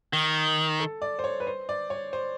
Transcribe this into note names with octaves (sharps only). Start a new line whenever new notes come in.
D#3
A4
D5
C5
C#5
B4
C5
D5
C#5
C5